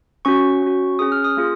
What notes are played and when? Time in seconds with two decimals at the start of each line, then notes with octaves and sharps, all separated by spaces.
0.25 C#4 F#4 C#6
0.62 C#4 F#4
0.99 C#4 G#4 D#6
1.12 F6
1.24 D#6
1.37 A#3 F4 G#4